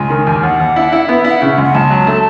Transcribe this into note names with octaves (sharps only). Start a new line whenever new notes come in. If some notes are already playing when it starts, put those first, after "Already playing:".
Already playing: C#2 G#5
D#3
D#2
D#2 F#5
D#2
E4
E4
B3 E5
E5
E4
F#5
C#3 E5
F#5
C#2
F#5
C#2 A5
F#3
A3